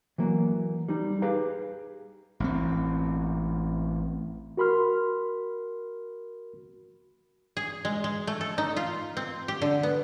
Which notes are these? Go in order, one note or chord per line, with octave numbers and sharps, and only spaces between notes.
E3 F#3 A#3
G3 D#4
G4 G#4 B4 F5 A#5
A1 C4
F#4 A#4 B5 C6 F6
G#4
G#3
G#3
A3
A4
D#4
F4
C4
G4
D3
B3